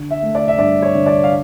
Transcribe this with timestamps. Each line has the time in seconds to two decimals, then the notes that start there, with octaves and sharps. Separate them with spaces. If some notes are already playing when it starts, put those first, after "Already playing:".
Already playing: D3
0.11 E5
0.23 A3
0.35 D5
0.48 E5
0.58 G2 D5
0.82 C#5
0.95 D3
1.06 D5
1.24 F5